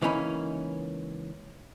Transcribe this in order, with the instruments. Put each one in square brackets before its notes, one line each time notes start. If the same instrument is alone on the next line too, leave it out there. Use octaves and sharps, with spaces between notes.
[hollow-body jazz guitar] C#2 E3 A#3 C#4 D#4 B5